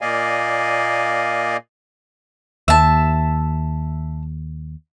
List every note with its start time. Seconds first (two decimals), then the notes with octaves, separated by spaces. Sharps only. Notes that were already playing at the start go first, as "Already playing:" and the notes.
0.01 A#2 A#3 D5 D#5 F5 G#5
2.68 D#2 E5 A5